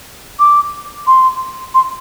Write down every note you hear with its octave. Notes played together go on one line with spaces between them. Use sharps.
D6
C6
C6